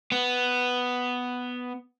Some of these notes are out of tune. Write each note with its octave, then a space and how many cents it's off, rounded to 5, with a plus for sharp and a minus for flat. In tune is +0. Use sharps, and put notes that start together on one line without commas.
B3 +5